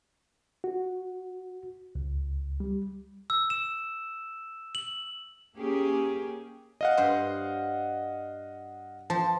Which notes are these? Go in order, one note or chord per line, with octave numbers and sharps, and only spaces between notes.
F#4
C#2
G3
E6
E7
F#7
A#3 C#4 G4 G#4
D#5 F5 F#5
G2 C5
F3 A5